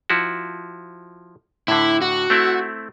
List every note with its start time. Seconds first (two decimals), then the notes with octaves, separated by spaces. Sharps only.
0.10 F3 E4 F#4
1.68 A2 D3 E4
2.02 F#4
2.30 A3 C4 E4